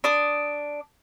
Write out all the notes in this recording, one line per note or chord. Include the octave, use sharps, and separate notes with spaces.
D4 D6 D#6